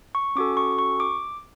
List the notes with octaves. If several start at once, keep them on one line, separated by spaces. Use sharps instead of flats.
C#6
C#4 F#4 A4 D6
C#6
C#6
D6